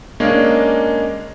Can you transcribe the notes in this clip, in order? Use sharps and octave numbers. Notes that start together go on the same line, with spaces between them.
G#3 A#3 C#4 D4